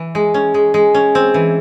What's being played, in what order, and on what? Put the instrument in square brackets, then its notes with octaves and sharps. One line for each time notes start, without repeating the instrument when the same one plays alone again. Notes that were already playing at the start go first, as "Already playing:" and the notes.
Already playing: [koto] E3
G#3
C#4
G#3
G#3
C#4
C4
E3